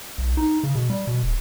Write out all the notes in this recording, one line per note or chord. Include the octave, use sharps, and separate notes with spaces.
B1
D#4
C#3
B2
G3
B2
D1